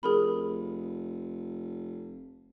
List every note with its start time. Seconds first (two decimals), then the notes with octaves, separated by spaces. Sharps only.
0.03 F1 G#4 A#4 B5